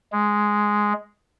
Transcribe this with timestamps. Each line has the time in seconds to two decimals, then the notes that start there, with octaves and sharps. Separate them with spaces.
0.12 G#3